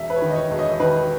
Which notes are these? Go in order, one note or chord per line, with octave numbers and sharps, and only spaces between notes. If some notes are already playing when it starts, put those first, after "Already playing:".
Already playing: E1 E5
B4
C#5
D#3
D#5
C#5
E1
D#5
D#3 B4